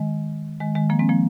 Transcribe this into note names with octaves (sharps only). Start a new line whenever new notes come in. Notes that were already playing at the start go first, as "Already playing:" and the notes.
Already playing: D#3 G#3
D#3 G#3
D#3 G#3
F3 A#3
G#3 C4
F3 A#3